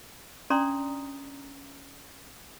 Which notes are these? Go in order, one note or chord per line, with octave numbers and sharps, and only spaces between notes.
C#4 D4 D5 A#5 C6 D#6